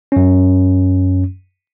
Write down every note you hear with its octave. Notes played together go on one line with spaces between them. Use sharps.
F#2 C#4